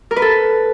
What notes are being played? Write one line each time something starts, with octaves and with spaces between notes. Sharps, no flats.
A#4
B4
A4